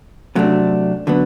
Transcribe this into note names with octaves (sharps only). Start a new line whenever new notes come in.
C3 F#3 A3 D4
D3 F#3 B3